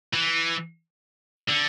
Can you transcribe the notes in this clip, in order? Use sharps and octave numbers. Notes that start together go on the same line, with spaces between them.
E3
D3